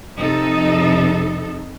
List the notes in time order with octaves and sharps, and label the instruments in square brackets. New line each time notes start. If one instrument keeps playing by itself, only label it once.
[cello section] F2 C3 D#4 A4